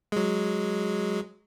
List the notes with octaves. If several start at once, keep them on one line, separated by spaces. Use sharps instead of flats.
F#3 G#3